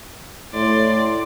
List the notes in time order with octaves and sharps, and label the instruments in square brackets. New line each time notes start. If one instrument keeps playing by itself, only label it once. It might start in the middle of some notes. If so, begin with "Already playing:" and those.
[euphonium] A2 [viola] D5 C6